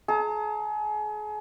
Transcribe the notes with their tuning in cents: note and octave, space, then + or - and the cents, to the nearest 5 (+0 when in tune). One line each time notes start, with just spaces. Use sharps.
G#4 +35 A#5 -45